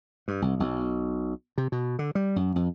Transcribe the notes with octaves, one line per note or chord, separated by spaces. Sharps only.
G2
C2
B1
C3
B2
D3
G3
F#2
F2